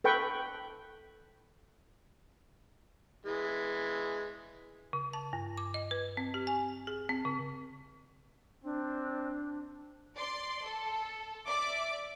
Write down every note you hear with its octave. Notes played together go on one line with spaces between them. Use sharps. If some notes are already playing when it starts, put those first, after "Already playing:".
A4 B4 G5 C#6
E3 G#3
C#3
A5
G2
D6
D#5
B4
C4
G4
G#5
G#4
C4
C#3
C4 D4
D5 C6
A4
D5 E5 D6